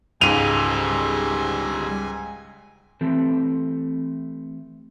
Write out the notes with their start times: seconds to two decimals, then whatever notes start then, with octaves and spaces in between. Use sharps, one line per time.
0.21 C#2 G#2 G3 A4 G#5 D#7 F7
3.01 E3 A3 C4 G4 A4